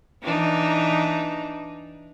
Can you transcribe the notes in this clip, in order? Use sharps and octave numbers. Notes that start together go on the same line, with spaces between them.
E3 D4 D#4